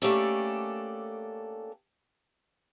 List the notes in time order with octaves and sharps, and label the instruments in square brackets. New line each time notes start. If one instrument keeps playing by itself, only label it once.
[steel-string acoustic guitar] A3 A#3 C#4 D4 G4 A4